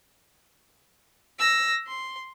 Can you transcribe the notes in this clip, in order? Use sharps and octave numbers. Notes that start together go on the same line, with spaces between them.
E6 A#6
C6